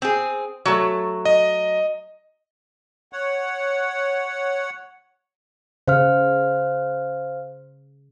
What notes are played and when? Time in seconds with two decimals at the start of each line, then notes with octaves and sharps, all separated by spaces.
0.02 C4 G#4
0.66 F#3 A3
1.25 D#5
3.13 C#5 F#5
5.88 C#3 C5 F5 F6